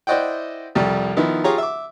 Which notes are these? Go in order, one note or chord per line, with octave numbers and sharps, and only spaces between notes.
E4 C5 D5 D#5 F#5 G5
C2 F2 G3 G4
D#3 F3 B3 D#4 E4
F4 G4 G#4 C#5 A#5
E5 D6